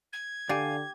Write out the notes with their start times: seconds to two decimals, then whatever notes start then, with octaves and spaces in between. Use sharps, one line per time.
0.13 G#6
0.49 D3 G4 D5 F5 G#5